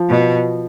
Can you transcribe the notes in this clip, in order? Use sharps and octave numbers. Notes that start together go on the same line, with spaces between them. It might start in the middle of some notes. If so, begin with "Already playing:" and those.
Already playing: F3
B2